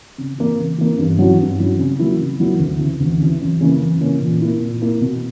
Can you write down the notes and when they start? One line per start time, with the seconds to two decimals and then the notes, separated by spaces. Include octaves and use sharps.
0.18 C#3
0.38 E3 A#3
0.58 C#3
0.78 E3 A#3
0.98 G2
1.19 F#3 C#4 E4
1.39 G2
1.59 F#3 C#4 E4
1.79 C#3
1.99 F#3 A#3 E4
2.20 C#3
2.40 F#3 A#3 E4
2.59 D2
2.79 C#3 E3
3.00 D2
3.20 C#3 E3
3.41 F#2
3.61 C#3 E3 A#3 C#4
3.80 F#2
4.01 C#3 E3 A#3 C#4
4.22 A#2
4.41 A#3 E4
4.62 A#2
4.82 A#3 E4
5.01 B2